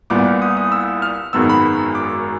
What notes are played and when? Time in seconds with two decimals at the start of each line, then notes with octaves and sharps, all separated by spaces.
0.10 C2 A#2 G3 B3 D6
0.42 D#6
0.57 D#6
0.72 E6
1.02 F6
1.33 G#1 F#2 D#3 G#3 B3 E6
1.50 B5
1.95 D6